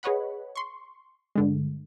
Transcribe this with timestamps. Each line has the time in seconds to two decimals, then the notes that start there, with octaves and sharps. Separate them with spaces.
0.03 G#4 B4 C#5 D#5 F#5 B5
0.56 C6 C#6
1.36 G2 D3 G#3